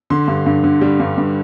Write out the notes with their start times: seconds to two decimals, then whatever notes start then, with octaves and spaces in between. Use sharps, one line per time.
0.10 D3 C6
0.28 G2
0.46 G2
0.64 D3
0.81 G3
1.00 G2
1.18 G2